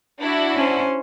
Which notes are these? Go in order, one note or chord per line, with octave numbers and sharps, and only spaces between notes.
D4 E4 F#4
C#4 C5